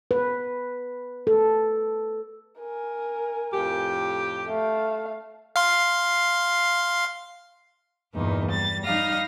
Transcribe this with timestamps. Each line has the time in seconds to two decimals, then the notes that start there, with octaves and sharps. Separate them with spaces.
0.11 B4
1.27 A4
2.60 A#4 G#5
3.53 F2 A2 G4
4.47 A3 F5
5.56 F5 C6
8.13 E2 G2 A#2 D#4
8.49 G3 A6
8.83 G3 D#4 F5 F6 A#6